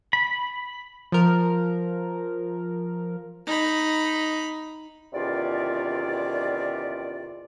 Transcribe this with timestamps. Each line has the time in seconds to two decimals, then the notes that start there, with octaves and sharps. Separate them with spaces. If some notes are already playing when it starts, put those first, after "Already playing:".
0.13 B5
1.12 F3 A#4
3.47 D#4 B5
5.13 E2 C3 D#3 C#4 F4 D5